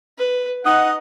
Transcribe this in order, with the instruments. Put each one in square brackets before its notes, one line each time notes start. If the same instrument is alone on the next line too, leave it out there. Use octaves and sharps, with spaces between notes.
[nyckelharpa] B4
[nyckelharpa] D#4 [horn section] D#5 F#5